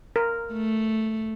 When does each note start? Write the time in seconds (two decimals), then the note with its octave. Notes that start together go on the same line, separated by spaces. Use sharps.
0.16 A#4
0.52 A3